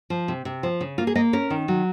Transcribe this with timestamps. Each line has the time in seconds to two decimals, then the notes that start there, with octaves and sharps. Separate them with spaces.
0.10 F3
0.28 C3
0.45 C3
0.63 F3
0.81 C#3
0.98 A#3 F4
1.07 G#4
1.15 A#3 D#5
1.33 C#4 A#4
1.50 D#3
1.68 F#3